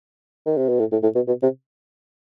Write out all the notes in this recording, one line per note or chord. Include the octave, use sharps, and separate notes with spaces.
D#3
C3
B2
A2
A2
A2
B2
B2
C3